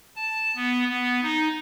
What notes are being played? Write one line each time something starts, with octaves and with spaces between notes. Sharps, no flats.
A5
B3
B3
D#4